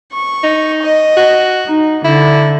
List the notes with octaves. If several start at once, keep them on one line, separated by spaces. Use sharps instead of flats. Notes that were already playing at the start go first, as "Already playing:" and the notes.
C#6
D#4
D#5
F#4
D#4
D3 E4